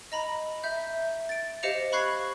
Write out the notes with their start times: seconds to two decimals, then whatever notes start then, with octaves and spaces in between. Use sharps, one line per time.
0.12 D#5 A#5 B5
0.64 E5 G6
1.29 A6 D7
1.63 G4 C5 D#5 F5 C#7 F7
1.92 B5 C#6 F#6 G#6 C7